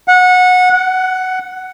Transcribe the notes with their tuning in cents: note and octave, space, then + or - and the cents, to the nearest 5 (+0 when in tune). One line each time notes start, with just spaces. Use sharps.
F#5 -20
F#5 +10